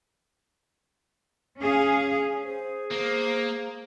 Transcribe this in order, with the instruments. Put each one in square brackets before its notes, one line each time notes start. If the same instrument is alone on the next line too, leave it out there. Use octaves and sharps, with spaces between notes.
[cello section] C#4 G#4 F5
[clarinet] G#4 [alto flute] C5
[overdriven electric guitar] A#3 [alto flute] C5